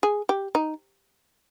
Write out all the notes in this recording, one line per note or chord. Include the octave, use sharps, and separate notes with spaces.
G#4
G4
D#4